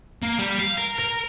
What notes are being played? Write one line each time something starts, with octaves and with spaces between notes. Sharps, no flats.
A#3
G3
F5
A#4
A#4